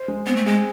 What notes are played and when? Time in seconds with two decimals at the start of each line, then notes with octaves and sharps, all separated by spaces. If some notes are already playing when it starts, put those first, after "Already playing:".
Already playing: C5
0.08 G#3
0.26 B3 C4
0.36 A3
0.46 G#3 G#4